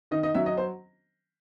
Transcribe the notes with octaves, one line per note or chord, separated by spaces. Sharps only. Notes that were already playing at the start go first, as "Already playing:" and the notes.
D#3 D#5
D#5
F#3 E5
D#5
C5